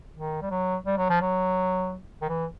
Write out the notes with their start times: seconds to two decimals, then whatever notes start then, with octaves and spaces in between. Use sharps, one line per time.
0.16 D#3
0.42 G3
0.50 F#3
0.86 G3
0.98 F#3
1.10 F3
1.21 F#3
2.22 D#3
2.29 E3